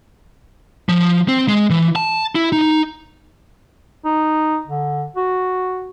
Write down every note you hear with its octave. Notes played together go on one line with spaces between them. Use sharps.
F3
C4
G#3
E3
A5
E4
D#4
D#4
D3
F#4